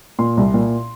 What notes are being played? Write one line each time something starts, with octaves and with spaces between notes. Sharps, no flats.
A#2 C6
C2
A#2